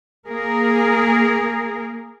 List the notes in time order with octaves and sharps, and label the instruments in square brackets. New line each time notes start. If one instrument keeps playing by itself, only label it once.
[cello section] A#3 G#4 A#4